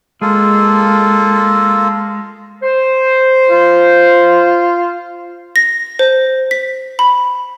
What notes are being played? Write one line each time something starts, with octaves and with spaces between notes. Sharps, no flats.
G#3 A#3 F4 A4
C5
F4
A#6
C5
B6
B5